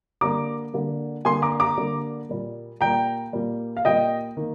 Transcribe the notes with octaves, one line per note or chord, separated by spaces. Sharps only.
D3 G3 A#3 A#5 D6
D3 G3 A#3
D3 G3 A#3 G#5 C6
A#5 D6
A#5 D6
D3 G3 A#3
A#2 G3 A#3
A#2 G3 A#3 G5 A#5
A#2 G3 A#3
F5
A#2 G3 A#3 D#5 G5
D#3 A#3